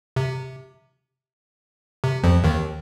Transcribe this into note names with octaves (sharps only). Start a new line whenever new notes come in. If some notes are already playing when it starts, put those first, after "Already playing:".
C3
C3
F2 F3
D#2 D#3